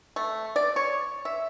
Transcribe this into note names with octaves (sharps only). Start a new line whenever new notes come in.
A3
D5
C#5
E5